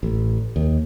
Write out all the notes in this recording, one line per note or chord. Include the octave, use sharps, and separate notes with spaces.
A1
D#2